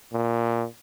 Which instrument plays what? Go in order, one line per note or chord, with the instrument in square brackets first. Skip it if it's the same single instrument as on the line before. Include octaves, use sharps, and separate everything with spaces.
[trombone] A#2